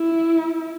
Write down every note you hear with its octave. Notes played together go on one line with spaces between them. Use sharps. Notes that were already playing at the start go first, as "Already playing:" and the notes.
Already playing: E4